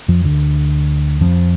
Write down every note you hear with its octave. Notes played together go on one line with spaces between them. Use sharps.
F2 F3
D2 D3
F2 F3